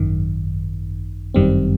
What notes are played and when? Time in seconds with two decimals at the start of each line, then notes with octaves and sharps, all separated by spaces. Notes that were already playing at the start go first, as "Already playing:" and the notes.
Already playing: G#1 F#2 D#3
1.34 G1 F#2 D#3 G3 C4